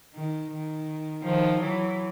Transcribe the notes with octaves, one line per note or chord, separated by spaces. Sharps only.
D#3
D#3
D#3 F3
E3 F#3